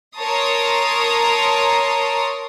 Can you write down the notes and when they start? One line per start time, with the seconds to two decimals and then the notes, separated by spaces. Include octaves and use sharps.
0.16 A#4 C#5 A5 A#5 C6 D#6